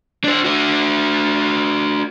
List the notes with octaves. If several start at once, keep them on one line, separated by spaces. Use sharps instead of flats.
D4 C5
D4 F#4